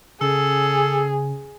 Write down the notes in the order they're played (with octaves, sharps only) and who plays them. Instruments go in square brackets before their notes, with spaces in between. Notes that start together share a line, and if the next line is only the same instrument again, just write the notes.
[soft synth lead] C#3 [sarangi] G#4 [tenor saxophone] A4